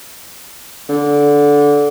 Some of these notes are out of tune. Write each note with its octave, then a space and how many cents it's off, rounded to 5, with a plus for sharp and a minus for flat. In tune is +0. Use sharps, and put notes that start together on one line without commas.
D3 -15